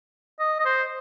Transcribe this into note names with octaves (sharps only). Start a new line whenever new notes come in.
D#5
D#5
C5